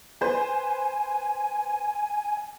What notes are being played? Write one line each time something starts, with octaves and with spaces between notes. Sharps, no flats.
B4 C5 G#5